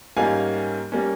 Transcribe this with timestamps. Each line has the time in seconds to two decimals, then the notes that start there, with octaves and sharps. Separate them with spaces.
0.17 G#2 G3 A#3 C#4 F5 G#5
0.92 G3 A#3 C#4